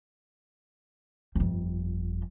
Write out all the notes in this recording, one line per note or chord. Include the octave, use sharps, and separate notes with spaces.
G1 F2